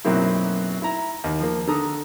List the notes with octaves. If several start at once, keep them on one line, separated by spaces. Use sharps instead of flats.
B1 F#2 F#3 A#3 C4 E4
E4 A#5
D#2
F3 A#3
D3 A4 A#5 D#6